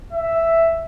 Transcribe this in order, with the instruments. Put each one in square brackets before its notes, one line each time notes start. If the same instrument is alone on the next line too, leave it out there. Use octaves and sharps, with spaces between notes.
[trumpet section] E5